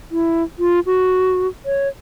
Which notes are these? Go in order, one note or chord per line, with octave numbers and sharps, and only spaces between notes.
E4
F4
F#4
C#5